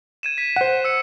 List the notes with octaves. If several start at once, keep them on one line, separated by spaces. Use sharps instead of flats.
G#6 D#7 E7
B6
C5 F#5
E6 C#7